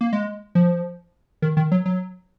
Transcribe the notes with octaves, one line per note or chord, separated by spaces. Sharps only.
A#3
G#3
F3
D#3
D#3
F#3
F#3